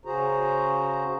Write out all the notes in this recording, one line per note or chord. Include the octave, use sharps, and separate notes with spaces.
C#3 F#4 G#4 C5 A#5